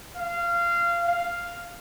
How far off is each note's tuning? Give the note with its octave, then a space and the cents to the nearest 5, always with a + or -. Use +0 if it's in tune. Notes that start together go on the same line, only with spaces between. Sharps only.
F5 -20
F5 +0